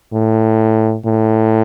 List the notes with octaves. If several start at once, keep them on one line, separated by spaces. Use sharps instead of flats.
A2
A2